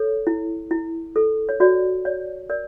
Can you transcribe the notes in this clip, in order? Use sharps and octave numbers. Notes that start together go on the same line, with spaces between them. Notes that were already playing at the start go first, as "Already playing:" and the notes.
Already playing: A4 C#5
E4
E4
A4
C#5
F#4 D5
C#5 D5
A#4 D5